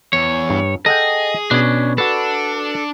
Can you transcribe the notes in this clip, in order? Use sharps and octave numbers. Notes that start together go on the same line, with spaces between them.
E2 C#5
G2
G#4 A4 D#5 F#5 G5
B2 C#4 D4
D4 F#4 A4 B4